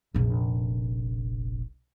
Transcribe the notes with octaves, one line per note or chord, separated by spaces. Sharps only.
F1 A#1